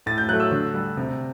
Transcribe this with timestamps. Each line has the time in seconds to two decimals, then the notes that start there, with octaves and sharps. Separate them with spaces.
0.06 A2 A6
0.18 G6
0.29 F#3 A3 F#6
0.40 E6
0.51 D3
0.74 G3
0.97 C3